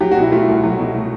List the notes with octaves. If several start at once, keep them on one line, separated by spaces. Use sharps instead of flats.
F#3 G4
F#4
B2 E4
A3 F4
C2
F#3
B2
A3